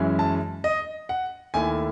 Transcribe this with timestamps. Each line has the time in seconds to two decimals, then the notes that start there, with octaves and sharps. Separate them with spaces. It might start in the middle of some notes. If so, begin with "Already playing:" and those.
Already playing: F#2 E3 G#3 C#4 E4
0.19 A5
0.64 D#5
1.09 F#5
1.54 D#2 D#3 A3 E4 G#5